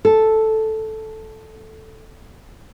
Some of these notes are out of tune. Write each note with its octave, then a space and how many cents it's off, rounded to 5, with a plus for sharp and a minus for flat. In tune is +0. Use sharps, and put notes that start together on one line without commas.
A4 -5